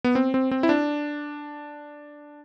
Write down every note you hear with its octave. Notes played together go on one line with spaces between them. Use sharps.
B3
C4
C4
C4
E4
D4